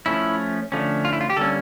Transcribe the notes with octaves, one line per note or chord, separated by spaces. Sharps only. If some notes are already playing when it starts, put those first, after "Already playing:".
F3 A3 C#4 E4
D3 F3 A3 C#4
F4
E4
F4
G4
D3 G3 A#3 C#4 A4